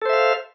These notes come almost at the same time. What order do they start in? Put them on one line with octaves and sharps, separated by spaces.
A4 C5 E5 F5